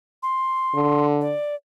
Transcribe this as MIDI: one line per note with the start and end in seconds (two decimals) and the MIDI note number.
0.23 1.06 84
0.74 1.33 50
1.21 1.55 74